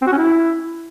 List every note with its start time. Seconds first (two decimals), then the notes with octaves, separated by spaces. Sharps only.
0.02 C4
0.07 F#4
0.12 C#4
0.17 E4